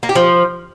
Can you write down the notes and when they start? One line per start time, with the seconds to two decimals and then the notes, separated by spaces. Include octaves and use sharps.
0.03 A#3
0.09 G4
0.15 F3